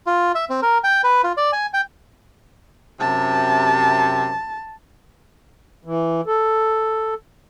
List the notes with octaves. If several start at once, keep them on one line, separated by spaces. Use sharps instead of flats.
F4
E5
C4
A#4
G5
B4
F4
D5
G#5
G5
F#2 C3 A5
E3
A4